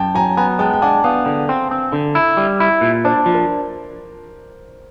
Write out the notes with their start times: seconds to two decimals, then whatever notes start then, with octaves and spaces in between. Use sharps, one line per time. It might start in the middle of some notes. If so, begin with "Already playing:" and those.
Already playing: F#2 G5 A5
0.15 F#3 G#5 A#5
0.37 B3 G#5 A#5
0.59 G#3 G5 A5
0.73 G5
0.82 D4 F#5 G#5
1.04 B3 F5 G5
1.26 D3
1.49 C4
1.71 C4
1.93 D3
2.15 E4
2.37 G3
2.60 E4
2.81 A#2
3.04 D4 C5 D5
3.26 F3
3.34 A#4